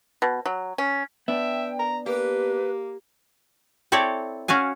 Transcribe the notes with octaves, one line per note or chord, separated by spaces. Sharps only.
B2
F#3
C#4
B3 D4 E5 G5
A#5
A#3 G4 B4
C4 E4 A4 C#5 D5
C#4 F#4 F5 G#5